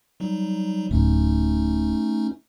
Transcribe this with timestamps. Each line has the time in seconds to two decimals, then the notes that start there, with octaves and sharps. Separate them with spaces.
0.20 F#3 G3 D#4
0.91 D1 A3 C#4 D#4